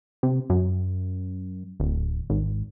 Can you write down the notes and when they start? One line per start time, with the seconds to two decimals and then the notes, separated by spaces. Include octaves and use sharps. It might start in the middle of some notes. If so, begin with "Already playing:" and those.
0.23 C3
0.50 F#2
1.80 D1
2.30 G#1